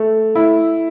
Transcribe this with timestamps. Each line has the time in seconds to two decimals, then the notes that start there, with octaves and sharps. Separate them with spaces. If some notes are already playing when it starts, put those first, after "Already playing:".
Already playing: A3
0.35 E4